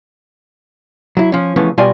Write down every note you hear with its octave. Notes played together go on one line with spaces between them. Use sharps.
F#3 E4
F3 C#4
C#3 E3 F3 A3 B3 C#4
B2 G3 F4 D5 D#5 G#5